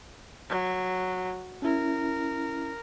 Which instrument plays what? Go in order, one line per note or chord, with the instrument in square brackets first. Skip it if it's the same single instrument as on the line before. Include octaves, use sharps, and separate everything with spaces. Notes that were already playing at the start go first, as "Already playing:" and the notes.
[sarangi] F#3
[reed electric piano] C#4 E4 [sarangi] A#4